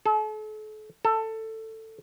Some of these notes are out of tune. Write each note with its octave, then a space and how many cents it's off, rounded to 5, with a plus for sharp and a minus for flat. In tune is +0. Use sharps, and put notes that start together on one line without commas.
A4 -40
A4 +15